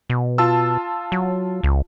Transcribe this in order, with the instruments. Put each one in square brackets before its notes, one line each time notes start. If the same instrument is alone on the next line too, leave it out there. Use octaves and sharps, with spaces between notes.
[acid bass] B2
[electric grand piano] F4 A5 E6
[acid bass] F#3
C#2